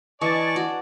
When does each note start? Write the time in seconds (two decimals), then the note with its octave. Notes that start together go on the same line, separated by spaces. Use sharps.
0.21 E3 D5 D#5 G#5 A5 C#6 A6
0.56 F#4